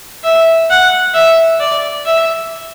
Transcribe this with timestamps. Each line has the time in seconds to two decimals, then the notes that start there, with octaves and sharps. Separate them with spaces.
0.24 E5
0.70 F#5
1.15 E5
1.60 D5
2.06 E5